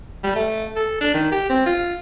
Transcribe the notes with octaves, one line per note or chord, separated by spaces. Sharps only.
G3
A3
A4
D4
D#3
G4
C4
F4